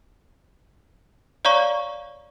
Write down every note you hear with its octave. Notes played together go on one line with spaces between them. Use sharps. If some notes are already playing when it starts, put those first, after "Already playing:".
C#5 D5 F5 A#5 C#6